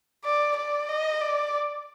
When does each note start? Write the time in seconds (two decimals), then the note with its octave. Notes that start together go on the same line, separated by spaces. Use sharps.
0.24 D5
0.57 D5
0.89 D#5
1.21 D5